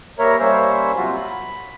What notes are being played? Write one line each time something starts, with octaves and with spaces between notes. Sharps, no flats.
G3 A#3 A#4 C#5 E5 A#5
G3 A#3 C#4 C5 C#5 E5
C3 F#3 F4 F#4
B5